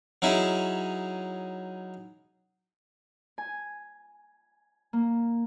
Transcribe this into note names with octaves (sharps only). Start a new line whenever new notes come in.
F#3 C#4 D#4 E4 G#4 E5
G#5
A#3